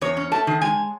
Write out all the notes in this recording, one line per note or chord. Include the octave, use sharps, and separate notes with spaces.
E2 C#5
C#4
A3 A5
D#3
G#3 G#5